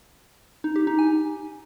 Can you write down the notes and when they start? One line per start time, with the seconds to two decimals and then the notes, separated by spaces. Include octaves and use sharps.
0.64 D#4
0.76 G4
0.87 D#4
0.99 G#5